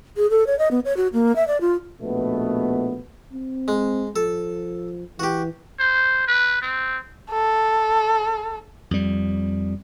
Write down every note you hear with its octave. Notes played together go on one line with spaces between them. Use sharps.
G#4
A4
C#5
D#5
B3
C#5
F#4
A#3
E5
D5
F4
A#1 B2 A3 B3
C4
G#3
F3 A4
E3 F#4 G4
C5
B4
C4
A4
F2 G3